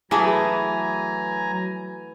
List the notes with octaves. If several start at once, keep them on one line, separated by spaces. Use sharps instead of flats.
E3 F#3 A3 B3 G#4 G#5 A#5